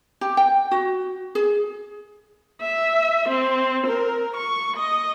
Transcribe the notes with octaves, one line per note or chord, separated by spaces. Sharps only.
G4
G5
F#4
G#4
E5
C4
A#4
C#6
D#5